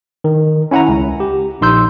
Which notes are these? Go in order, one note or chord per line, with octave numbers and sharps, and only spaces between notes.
D#3
C#4 E4 F#5 G#5 A#5
C#2
G4
A#1 D#4 C6 E6 G6